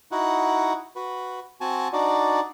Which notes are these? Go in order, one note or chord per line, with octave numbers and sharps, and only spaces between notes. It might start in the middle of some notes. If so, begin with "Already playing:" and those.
D#4 E4 F#4 F#5
F#4 B4
C4 F#4 G#5 A5
D4 D#4 F#4 D5